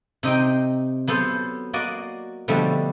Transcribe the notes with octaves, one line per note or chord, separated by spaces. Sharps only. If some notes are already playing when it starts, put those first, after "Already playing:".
C3 D#4 D#5 G5
F#3 B3 A4 C5
A#3 F#4 D5 D#5
B2 D3 F3 G3 A3